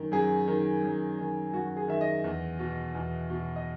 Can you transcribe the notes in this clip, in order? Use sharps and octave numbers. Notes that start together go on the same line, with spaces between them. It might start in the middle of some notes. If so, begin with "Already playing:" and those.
Already playing: F#2 D#3
F#2 G#4
D#3
F#2
D#3
F#2 F#4
G#4
D#3 E5
D#5
E2
B2
E2
B2
D#5